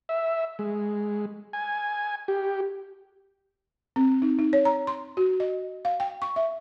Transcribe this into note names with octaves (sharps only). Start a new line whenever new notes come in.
E5
G#3
G#5
G4
C4
D#4
D#4
C#5
A#5
C6
F#4
D#5
F5
G5
C#6
E5